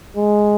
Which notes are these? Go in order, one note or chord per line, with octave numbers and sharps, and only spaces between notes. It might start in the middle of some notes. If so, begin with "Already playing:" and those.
G#3